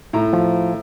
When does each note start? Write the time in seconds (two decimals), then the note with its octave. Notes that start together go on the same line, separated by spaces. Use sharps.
0.13 A2 A#5
0.33 F3